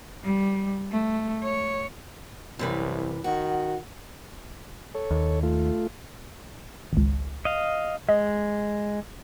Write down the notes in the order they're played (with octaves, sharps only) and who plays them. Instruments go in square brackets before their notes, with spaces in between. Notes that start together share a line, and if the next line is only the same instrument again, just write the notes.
[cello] G3
A3
C#5
[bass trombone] C2 [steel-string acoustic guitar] F#2 C3 E3
[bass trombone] D#3 [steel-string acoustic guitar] F#4
[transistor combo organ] A4 C#5
[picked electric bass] D#2
[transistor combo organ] A3 F4
[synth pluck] G#1 C#2
[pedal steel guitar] D#5 F5
[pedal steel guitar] G#3 [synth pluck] D#5